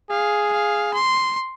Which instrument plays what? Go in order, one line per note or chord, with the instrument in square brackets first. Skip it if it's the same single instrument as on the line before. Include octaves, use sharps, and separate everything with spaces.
[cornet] G#4 [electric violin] F5
[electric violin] F5
C6